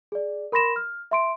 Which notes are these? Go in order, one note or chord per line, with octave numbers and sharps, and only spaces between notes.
G#4 D5
A#4 B5 C6 A#6 E7
F6
E5 C6 D7